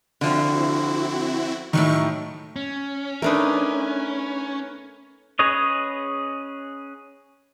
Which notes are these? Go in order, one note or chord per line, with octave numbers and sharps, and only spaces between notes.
D3 F3 C4 E4 F#4
A2 D#3 F#3 D#4 C#6
C#4
A3 D4 D#4 A#4 B4
C#4 G#4 B4 C#5 D#5